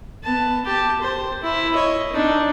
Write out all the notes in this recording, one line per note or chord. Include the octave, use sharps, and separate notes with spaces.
B3 A5
G4 A5
C5
E4
C#5 D#5
D4 D#4